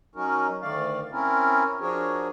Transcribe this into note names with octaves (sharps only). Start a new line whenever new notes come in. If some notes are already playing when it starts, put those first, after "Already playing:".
F#3 C#4 D#4 F#4 A#4
D2 D#3 A3 D5 F5
C4 C#4 E4 A#4
F3 D4 F#4 G#4 A#4 C#5